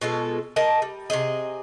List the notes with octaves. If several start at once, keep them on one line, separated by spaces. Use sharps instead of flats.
B2 G#3 F4 A4
A#4 D#5 A5
G3
C3 E3 G#4 D#5